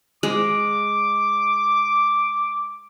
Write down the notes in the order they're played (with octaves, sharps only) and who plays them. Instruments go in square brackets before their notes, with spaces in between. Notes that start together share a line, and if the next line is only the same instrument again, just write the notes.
[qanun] G#3 [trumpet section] D6